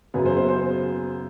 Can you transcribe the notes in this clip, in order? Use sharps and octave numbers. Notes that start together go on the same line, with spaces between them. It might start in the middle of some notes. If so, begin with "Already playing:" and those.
F#2 C#3 F#3 B3
C5
C5
C5